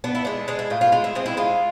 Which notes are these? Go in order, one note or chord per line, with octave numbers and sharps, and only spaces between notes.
B3 D4
E4
G#3 D4
G#3 D4
E4
A2 F4
F4
G#3 F4
E4
G#3 C4
E4
G#3 F4